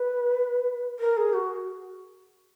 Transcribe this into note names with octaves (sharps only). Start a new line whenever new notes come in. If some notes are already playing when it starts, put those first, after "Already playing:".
Already playing: B4
A#4
G#4
F#4